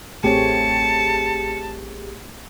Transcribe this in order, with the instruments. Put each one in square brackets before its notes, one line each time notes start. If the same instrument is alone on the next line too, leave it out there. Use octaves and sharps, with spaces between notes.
[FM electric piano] A1 G4 G#4 [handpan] A3 C4 C#5 [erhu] A5 [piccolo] C#7